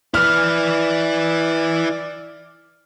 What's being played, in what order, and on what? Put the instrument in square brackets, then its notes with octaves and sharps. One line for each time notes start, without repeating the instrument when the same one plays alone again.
[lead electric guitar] E4 B4 [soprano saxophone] D5 [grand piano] F6